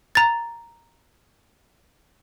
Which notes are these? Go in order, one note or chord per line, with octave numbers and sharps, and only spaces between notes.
A#5 A6